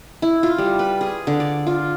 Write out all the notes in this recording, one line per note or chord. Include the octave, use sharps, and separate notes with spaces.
E4
F4
G3
B4
G#4
D3
D5
F4